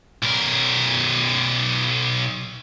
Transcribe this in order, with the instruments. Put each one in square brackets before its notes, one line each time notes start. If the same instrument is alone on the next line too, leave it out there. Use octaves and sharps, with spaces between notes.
[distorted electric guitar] B1 A#4